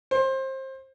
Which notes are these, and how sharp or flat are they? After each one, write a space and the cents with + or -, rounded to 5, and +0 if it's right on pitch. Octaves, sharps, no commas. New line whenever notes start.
C5 +25